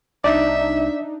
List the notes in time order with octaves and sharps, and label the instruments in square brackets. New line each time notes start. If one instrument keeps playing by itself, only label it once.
[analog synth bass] C2 [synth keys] D4 D#4 [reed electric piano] D5 [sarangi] E5